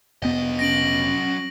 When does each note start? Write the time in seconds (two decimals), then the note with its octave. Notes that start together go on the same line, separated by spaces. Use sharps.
0.23 F1 F#3 B3 D#5
0.59 C#4 A#6 D7 F#7